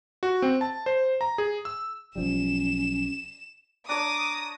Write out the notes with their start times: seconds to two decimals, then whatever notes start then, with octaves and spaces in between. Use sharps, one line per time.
0.23 F#4
0.42 C4
0.61 A5
0.86 C5
1.21 A#5
1.38 G#4
1.65 E6
2.16 B1 F3 G3 C#4 E7
3.89 D4 C#5 A#5 D6 D#6